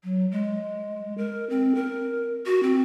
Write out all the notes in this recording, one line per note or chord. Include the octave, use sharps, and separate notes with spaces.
F#3
G#3
A#4
C4
A#4
F#4
C4